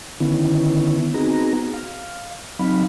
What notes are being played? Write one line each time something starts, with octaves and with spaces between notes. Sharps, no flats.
D3 D#3 B3 C#4 E4
B3 C4 D#4 F#4 G#4 A#5
F5
F#3 C4 D#4 F5 B5